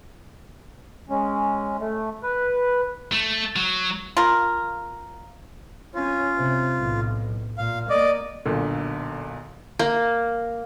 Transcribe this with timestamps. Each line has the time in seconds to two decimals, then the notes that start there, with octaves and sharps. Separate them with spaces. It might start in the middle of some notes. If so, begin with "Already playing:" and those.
1.09 G#3 C#4
1.79 A3
2.23 B4
3.12 A3
3.56 F#3
4.17 F4 A#4
5.95 C#4 F4
6.36 C3
6.77 B1 A2
7.58 A#2 F5
7.90 A#3 D5 D#5 D6
8.45 B1 A#2 D3
9.79 A#3